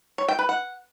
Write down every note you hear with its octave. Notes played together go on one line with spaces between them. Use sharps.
C#5
G5
B4
F#5